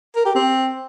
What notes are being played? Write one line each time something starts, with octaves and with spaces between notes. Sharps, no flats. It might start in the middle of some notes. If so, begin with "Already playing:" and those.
A#4
G4
C4